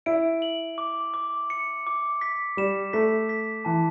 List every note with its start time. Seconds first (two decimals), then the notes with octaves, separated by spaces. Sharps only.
0.06 E4 D7
0.42 F#7
0.78 D6
1.14 D6
1.50 C#7
1.87 D6
2.21 B6
2.57 G3 E7
2.93 A3 B6
3.29 B6
3.65 E3 A5